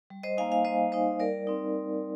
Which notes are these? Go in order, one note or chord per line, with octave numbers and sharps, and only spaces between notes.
G3
C5 D#5
A#3 D#4 F5 G#5
F5 G#5
G3 C5 D#5
A#3 D#4 C5 D#5
G3 A#4 D5
C4 D#4